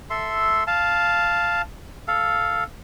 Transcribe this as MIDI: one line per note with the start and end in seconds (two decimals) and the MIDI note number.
0.10 0.64 69
0.10 0.64 76
0.10 0.64 84
0.67 1.62 77
0.67 1.62 81
2.08 2.64 69
2.08 2.64 77